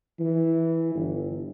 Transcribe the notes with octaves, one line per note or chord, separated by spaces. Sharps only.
E3
G1